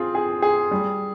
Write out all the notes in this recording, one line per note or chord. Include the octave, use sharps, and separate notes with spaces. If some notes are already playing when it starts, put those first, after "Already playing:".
Already playing: C4 F4 G#4
G#4
G#4
G3